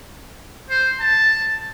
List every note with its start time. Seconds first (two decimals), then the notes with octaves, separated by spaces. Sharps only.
0.70 C5
1.00 A5